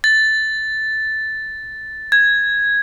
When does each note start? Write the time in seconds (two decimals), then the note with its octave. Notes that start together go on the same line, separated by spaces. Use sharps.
0.04 A6
2.12 G#6